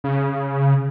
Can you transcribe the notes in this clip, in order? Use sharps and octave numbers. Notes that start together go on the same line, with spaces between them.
C#3